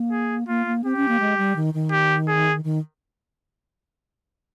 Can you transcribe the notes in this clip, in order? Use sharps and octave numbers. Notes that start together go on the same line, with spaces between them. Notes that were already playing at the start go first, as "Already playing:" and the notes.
Already playing: A#3
G#4
A#3 F4
A#3
C4 G4
C#4
A#3
G#3
G3
D#3
D#3
G4
G#4
D#3